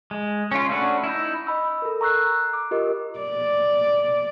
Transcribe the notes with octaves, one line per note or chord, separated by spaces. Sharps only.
G#3
C#4 F4
A3 C#4 D4 F#4 B4
D#4 E4
D#5 B5 E6
A4 A#4
A#5 C#6 E6 F#6 C7
D6
F4 G4 A#4 D#5
D5